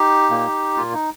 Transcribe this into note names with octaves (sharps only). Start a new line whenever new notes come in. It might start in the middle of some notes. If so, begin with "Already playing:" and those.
Already playing: D#4 G4
A#2 A#3
A#2 A#3 F4
D#4